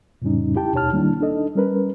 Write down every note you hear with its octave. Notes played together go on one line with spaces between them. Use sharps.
F2 A2 C#3 G3 C#4 D#4
E4 G4 G5 A5
D#2 B2 D#4 C#5 A5 F6
D#3 G3 A#3 D4 E4
D4 D#4 A4 D#5
G3 C#4 A#4 B4